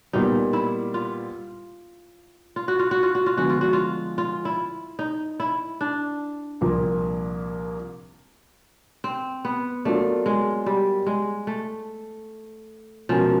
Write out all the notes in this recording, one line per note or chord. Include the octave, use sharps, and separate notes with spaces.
A#2 G3 B3 D#4
E4
F4
F4
F#4
F4
F#4
F4
F#4
F4
D3 F3 G#3 B3 F#4
F4
F#4
F4
F4
E4
D#4
E4
D4
C2 A#2 F3 A#3
C4
B3
F#3 A3 A#3 D4 F4
G#3
G3
G#3
A3
B2 F3 G#3 C#4 F#4 A#4